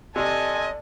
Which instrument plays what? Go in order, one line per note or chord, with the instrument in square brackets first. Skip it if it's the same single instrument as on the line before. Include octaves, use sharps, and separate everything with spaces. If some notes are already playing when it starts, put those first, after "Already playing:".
[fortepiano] C3 [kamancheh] A4 G#5 [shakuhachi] D5 [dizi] D#5